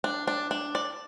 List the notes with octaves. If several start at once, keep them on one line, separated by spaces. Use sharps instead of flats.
D4
D4
D4
D5